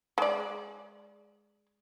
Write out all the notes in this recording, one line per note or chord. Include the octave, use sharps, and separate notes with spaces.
G#3 D5